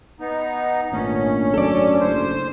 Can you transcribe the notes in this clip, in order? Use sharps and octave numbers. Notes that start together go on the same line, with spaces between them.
B3 D#4
G#1 A#2 A3 C#4 D4
F#2 A4 D5
F#1 C5